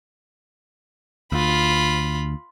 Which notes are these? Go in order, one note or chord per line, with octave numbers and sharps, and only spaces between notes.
D2 F4 B5